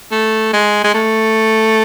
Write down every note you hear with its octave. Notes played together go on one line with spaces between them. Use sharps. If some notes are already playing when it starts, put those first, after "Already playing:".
A3
G#3
G#3
A3